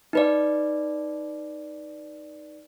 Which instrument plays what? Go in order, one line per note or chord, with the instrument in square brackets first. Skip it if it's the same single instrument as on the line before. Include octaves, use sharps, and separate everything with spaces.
[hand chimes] D#4 B4 D5